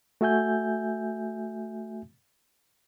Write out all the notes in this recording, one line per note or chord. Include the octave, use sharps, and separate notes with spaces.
A3 F#4 E5 G#5 G6